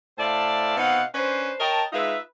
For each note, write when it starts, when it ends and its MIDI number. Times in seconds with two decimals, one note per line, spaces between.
0.18 0.77 45
0.18 0.77 72
0.18 0.77 74
0.18 0.77 76
0.18 0.77 77
0.18 0.77 81
0.77 1.01 47
0.77 1.01 60
0.77 1.01 63
0.77 1.01 77
0.77 1.01 78
1.15 1.52 61
1.15 1.52 62
1.15 1.52 71
1.15 1.52 72
1.59 1.82 70
1.59 1.82 73
1.59 1.82 75
1.59 1.82 79
1.59 1.82 81
1.93 2.17 56
1.93 2.17 63
1.93 2.17 65
1.93 2.17 71
1.93 2.17 76